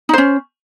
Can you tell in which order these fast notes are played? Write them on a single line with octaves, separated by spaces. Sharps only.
D#4 C5 C#4